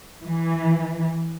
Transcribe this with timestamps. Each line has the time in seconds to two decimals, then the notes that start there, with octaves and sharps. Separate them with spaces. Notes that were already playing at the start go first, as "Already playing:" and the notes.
0.25 E3